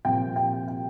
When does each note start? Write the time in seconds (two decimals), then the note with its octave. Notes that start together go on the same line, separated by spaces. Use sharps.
0.05 C2 A#2 F3 G5
0.36 G5
0.68 G5